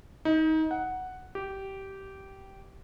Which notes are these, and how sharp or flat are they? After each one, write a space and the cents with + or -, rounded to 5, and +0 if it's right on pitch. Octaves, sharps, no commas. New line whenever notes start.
D#4 +25
F#5 +0
G4 -15